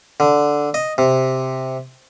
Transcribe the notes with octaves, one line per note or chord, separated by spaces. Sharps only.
D3
D#5
C3